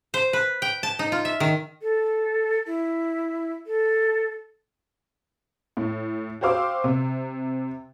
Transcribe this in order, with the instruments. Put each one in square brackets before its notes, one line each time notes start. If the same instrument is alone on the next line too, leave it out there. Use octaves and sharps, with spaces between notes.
[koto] C5
B4
G5
A5
D#4
F4
E5
D#3
[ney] A4
E4
A4
[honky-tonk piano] A2
F#4 G4 C5 F5 D6 E6
C3